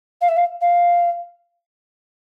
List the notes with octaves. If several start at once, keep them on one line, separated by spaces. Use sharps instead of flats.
F5
E5
F5
F5